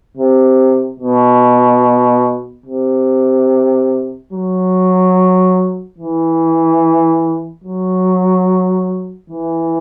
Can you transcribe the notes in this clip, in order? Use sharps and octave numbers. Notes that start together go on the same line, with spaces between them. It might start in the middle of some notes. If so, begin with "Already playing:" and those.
C3
B2
C3
F#3
E3
F#3
E3